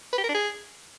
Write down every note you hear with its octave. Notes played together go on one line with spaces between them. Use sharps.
B4
G4
A#4
D4
G#4